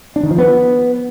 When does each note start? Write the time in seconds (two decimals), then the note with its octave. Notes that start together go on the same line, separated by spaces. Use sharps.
0.16 D4
0.23 D#3
0.31 F3
0.38 B3